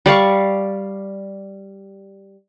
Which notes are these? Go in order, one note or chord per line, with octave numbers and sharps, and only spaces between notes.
G3 D5 F5 C#6